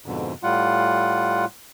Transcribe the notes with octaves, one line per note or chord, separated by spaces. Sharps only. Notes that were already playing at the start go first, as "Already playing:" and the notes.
F2 G#2 B2 D3
A2 G3 F4 F#5